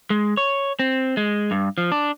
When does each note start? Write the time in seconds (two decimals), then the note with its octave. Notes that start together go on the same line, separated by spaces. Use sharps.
0.10 G#3
0.37 C#5
0.79 C4
1.17 G#3
1.51 G2
1.78 F3
1.92 D4